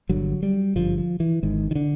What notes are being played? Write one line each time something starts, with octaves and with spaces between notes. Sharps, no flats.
G1 G2 D3 F#3
G3
G#1 G2 D3 F3
F3
E3
G#1 G#2 D#3
D#3
D3